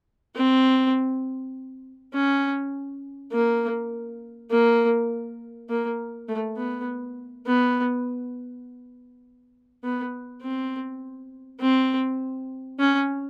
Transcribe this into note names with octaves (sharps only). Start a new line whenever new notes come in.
C4
C#4
A#3
A#3
A#3
A3
B3
B3
B3
C4
C4
C#4